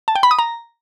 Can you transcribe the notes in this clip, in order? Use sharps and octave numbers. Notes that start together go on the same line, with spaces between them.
A5
G5
B5
D#6
A#5